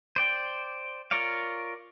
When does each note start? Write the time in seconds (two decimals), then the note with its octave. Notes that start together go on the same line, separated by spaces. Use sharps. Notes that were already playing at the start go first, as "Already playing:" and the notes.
0.16 C5 D5 G5
1.11 F4 A#4 C#5 D5 F5